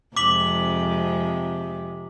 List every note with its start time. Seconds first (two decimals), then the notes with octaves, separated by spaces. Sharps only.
0.17 F2 C3 G#3 D6 B6 F#7